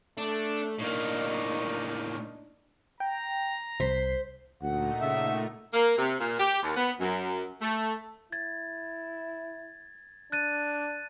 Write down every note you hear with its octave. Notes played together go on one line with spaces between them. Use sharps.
A3 D4
A2 A#3 D4 D#4
G5 A#5
C2 C5 B6 C7
D2 A#2 A3 D#4 F#5
C#3 E5
A#3
C3
A#2
G4
D#2
B3
F#2
A3
E4 G#6 A6
D4 F#6 A6 D#7